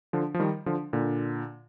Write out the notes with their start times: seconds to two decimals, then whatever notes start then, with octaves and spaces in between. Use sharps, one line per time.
0.13 D3 F3
0.34 F3
0.40 D#3 G3
0.66 D3 F3
0.93 A#2 D3